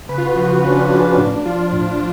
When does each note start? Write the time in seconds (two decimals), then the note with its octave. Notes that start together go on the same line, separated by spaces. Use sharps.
0.09 C#3 B4
0.18 F4
0.27 F#4
0.36 F3
0.45 F#4
0.63 C#3 C#4
0.70 D4
0.78 C#4
0.91 F3 D4
1.18 A2 D4
1.46 F3 F4
1.73 A2